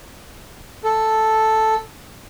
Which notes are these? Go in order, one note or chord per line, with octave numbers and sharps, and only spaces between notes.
A4